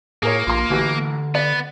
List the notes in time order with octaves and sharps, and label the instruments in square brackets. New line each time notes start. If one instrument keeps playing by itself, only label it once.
[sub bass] A2 [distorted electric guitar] A#3 [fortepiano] G#4 A#4 C#5
[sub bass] A#1 [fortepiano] F4 C6
[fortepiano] A1 E3 F#4 [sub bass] D3
[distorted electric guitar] B3 [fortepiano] D5